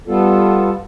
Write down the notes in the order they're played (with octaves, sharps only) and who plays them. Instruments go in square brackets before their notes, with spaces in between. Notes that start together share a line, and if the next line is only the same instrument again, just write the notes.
[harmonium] G3 B3 F4 A4